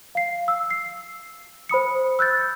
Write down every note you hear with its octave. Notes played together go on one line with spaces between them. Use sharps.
F5 C7
E6
C7
C5 B5 D#6 C#7
E6 F#6 G6 A6